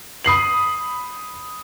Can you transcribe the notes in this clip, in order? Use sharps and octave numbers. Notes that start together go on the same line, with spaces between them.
B5 D#6 C7 F#7